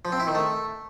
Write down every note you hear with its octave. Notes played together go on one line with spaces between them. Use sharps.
F3
C4
E4
D#3
A3